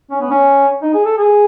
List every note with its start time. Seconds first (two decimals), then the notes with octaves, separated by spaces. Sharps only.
0.11 C#4
0.21 B3
0.30 C#4
0.82 D#4
0.94 G#4
1.06 A4
1.18 G#4